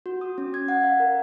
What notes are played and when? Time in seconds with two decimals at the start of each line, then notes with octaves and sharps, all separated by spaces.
0.06 F#4
0.21 D#6
0.38 C#4
0.54 G#6
0.68 F#5
0.83 F5
1.00 A#4